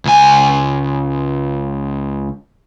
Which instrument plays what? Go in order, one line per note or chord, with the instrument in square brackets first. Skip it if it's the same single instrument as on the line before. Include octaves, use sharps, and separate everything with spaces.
[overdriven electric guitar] C#2 G#5